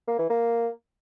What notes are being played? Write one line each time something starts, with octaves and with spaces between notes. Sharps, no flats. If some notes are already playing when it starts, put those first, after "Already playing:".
A#3
E3
A#3